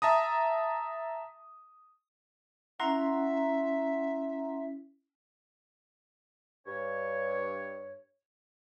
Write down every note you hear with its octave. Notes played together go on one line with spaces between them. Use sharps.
E5 A5 A#5 D#6
C#4 E4 E5 F#5 A#5 C6
G2 C#5